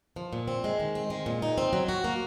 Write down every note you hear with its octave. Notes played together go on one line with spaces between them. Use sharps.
F3
A#2
C4
G#3
D#3
C4
G#3
A#2
D#4
C4
F#3
F#4
A#3